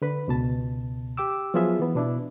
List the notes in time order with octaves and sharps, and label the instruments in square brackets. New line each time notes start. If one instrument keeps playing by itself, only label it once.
[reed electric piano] D3 B4 B5
C#2 B2 A5
G4 G5 D6 E6
F3 F#3 B3 F4 G#4 E5
E3 B3
B2 D4 E4